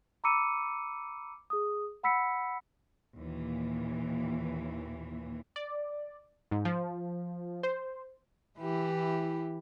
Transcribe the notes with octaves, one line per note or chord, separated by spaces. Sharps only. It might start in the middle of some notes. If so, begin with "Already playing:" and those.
A#5 B5 D6 E6 C#7 D#7
G#4 D#6
F#5 B5 E6 B6 C#7
D#2 A#2 E3
D5
G#2
F3
C5
E3 E4 G4